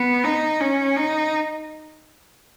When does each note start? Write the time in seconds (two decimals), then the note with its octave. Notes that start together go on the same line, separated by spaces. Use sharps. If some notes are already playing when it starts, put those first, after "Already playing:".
Already playing: B3
0.24 D#4
0.60 C#4
0.96 D#4